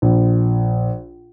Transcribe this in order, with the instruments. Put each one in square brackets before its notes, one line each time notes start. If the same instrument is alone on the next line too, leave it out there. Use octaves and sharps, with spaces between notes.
[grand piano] A#1